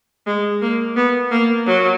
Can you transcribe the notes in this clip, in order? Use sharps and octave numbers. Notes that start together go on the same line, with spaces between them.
G#3
A#3
B3
A#3
F#3